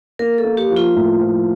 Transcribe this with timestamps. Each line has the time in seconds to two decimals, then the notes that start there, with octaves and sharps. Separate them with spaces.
0.19 A#3 A#4
0.38 A4
0.44 A#3
0.57 G4
0.70 F3
0.76 F4
0.95 A2
1.20 F3